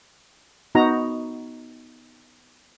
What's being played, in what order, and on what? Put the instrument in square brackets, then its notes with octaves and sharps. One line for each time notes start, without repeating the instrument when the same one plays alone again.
[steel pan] B3 D#4 F#4 A#5